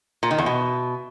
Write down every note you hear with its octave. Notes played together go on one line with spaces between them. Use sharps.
A#2
D#3
E2
B2